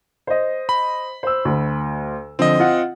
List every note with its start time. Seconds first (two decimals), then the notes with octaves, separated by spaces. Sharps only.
0.27 C5 D#5
0.69 B5
1.23 C5 E6
1.45 D2
2.39 D3 F3 C4 D#5
2.59 F4 F#5